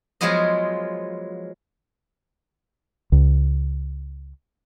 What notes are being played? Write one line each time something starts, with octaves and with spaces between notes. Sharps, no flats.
F3 F#3 G#3 B3 C5 D#5
C#2